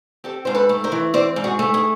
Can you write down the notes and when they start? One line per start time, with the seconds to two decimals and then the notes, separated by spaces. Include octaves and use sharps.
0.24 C4 G4 A4
0.45 G#2 C5
0.55 A4 B4
0.69 A3
0.84 A#4 C5
0.92 E3
1.14 C4 C5 D5
1.36 G#2
1.44 F#4 G#4
1.59 A3
1.74 G#4